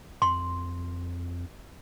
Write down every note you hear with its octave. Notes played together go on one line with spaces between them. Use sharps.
F2 C6